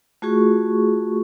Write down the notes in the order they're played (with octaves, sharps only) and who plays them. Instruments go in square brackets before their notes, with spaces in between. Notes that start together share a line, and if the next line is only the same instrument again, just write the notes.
[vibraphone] A3 F4 F#4 G#4 C#6